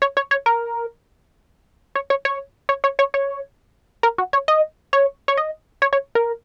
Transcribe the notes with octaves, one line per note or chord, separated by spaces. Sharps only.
C#5
C#5
C#5
A#4
C#5
C#5
C#5
C#5
C#5
C#5
C#5
A#4
F#4
C#5
D#5
C#5
C#5
D#5
C#5
C#5
A#4